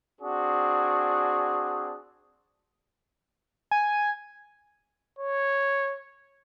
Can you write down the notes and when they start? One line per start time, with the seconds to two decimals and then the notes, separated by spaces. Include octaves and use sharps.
0.21 C4 D4 F#4 G#4
3.71 G#5
5.19 C#5